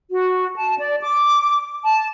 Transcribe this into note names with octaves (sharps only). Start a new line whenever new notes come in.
F#4
A5
D5
D6
A5